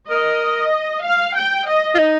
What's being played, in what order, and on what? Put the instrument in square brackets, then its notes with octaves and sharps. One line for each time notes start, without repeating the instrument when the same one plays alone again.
[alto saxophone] A#4 [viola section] D#5
[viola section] F5
G5
D#5
[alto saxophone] F4
D#4